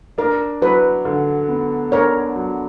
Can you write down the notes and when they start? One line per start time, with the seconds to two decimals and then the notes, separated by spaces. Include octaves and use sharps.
0.18 D4 A#4
0.62 F#3 B4
1.05 D3
1.49 B3
1.92 D4 A#4 C#5
2.36 F#3